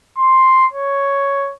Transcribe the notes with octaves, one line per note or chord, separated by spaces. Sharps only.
C6
C#5